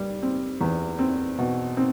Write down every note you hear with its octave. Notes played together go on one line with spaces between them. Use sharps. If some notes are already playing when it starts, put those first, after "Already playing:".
Already playing: G3
C4
E2
C4
B2
C4